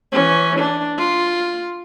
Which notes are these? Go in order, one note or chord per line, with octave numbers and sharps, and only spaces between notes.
E3 C#4
D4
F4